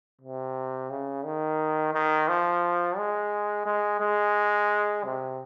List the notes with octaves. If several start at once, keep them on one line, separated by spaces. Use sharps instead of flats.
C3
C#3
D#3
D#3
F3
G#3
G#3
G#3
C3